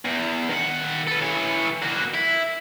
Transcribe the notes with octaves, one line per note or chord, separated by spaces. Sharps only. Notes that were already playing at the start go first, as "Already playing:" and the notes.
E2
D#3 F#5
A4 B4
E3 C#5
A#3 F#4
E4